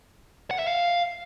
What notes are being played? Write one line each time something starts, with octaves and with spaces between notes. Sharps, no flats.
F#5
E5
F5